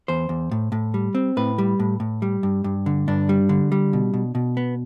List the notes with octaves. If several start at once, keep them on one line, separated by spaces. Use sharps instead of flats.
E2 C5
E2
A2
A2
G3
C4
A2 B4
G3
A2
A2
G3
G2
G2
D3
G2 D4
G3
D3
G3
B2
B2
B2
B3